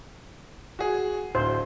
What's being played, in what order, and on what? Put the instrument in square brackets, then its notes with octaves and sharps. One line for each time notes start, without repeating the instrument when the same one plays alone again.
[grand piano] F#4 G#4
[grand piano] D1 [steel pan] C5